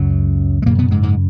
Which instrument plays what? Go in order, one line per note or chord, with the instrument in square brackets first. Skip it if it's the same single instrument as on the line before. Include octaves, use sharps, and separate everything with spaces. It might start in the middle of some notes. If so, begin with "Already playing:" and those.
Already playing: [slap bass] C#2 F#2 C#3 F#3
G#3
F#2 A#2 C#3 A#3
B2 B3
G#2 G#3
G#2 G#3